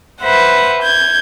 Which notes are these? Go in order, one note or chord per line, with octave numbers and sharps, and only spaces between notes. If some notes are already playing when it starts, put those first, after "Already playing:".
B4 C5 E5 F#5
G6 G#6